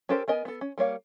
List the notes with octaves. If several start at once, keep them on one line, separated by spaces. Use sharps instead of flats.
C#4 G4 A4 A#4 C5
B3 A#4 D#5 G#5
B3 A4
C#4
G3 A#3 C#5 F5